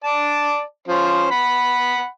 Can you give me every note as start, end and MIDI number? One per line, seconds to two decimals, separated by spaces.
0.04 0.61 74
0.04 0.61 81
0.88 1.26 53
0.88 1.26 61
0.88 1.26 72
1.31 2.06 78
1.31 2.06 83